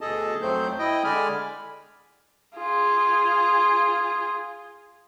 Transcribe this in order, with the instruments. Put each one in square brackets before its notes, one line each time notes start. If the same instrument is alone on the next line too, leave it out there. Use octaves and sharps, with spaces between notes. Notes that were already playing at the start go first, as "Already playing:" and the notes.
[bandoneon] D2 B2 G#4 A4 D#5 A5
F2 F#3 A3 C4 C5 G6
E4 D#5 G5
D3 G#3 D5 G#5 B5 F6
[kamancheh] F4 G#4